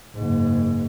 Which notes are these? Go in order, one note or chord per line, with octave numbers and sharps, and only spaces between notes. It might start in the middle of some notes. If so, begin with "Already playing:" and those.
F#1 G#2